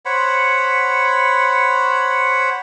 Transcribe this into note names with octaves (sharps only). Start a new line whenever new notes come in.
C5 C#5 F#5 B5